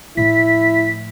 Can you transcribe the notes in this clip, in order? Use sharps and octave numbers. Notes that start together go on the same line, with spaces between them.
A2 F3 E4 B6